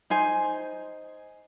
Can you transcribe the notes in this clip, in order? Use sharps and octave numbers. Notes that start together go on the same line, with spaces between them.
D#4 C5 G#5